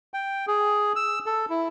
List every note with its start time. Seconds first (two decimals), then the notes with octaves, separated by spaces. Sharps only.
0.14 G5
0.48 G#4
0.96 E6
1.26 A4
1.50 E4